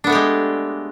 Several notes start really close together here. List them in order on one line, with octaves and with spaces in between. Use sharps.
D4 B3 A3 G4 G#3